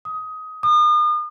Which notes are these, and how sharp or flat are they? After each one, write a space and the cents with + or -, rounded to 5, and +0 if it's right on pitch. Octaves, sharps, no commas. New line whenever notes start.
D#6 +15
D#6 -40